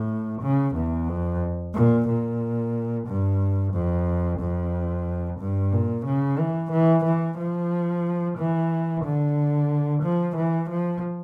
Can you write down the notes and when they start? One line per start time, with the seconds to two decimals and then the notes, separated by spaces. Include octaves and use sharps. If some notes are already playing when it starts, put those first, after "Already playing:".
Already playing: A2
0.42 C#3
0.76 E2
1.08 F2
1.74 A#2
2.08 A#2
3.07 G2
3.73 F2
4.40 F2
5.40 G2
5.72 A#2
6.06 C#3
6.38 E3
6.72 E3
7.04 E3
7.38 F3
8.38 E3
9.04 D3
10.03 F3
10.37 E3
10.70 F3